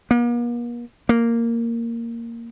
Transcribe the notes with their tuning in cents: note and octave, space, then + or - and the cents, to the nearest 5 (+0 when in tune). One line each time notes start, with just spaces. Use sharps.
A#3 +45
A#3 -10